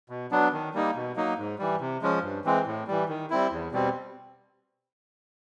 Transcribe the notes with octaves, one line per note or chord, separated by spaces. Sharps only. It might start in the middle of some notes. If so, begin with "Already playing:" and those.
B2
F#3 B3 D4
D#3
G3 A#3 D#4
B2
F#3 A#3 D#4
G#2
E3 G3
C3
F3 G#3 C#4
G2
E3 G#3 C4
A2
E3 G3
D#3
G3 C4 E4
E2
B2 G3 C4